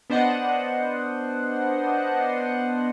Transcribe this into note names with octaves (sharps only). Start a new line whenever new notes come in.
B3 D4 C5 D#5 F#5